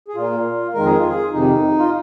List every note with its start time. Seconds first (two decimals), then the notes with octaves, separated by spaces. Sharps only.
0.08 G#4
0.15 A#2 A#3 F4
0.74 F2 D#3 G#3 A#4
0.85 G#4
0.98 F4
1.09 G#4
1.32 F2 C3 D#3 D#4
1.79 F4